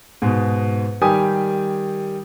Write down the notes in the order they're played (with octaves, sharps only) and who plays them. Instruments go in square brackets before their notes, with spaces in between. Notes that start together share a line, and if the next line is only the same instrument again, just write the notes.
[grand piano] G#2 B2
D#3 G3 G4 G#5 D#6